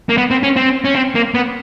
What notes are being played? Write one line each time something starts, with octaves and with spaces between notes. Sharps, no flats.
A#3
B3
C4
C#4
C4
C#4
C4
A#3
B3